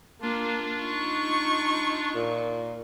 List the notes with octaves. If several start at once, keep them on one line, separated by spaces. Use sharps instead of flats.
A#3 D4 F4
D#4 C#6
A#2